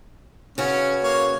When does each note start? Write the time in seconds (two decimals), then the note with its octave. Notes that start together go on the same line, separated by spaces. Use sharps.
0.58 C#3 C#4 F#4 B4
1.03 A#3 C#5